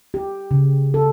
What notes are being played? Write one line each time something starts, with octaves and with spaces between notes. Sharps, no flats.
G4
C#3
A4